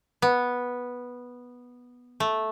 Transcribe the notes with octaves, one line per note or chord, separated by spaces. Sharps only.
B3
A3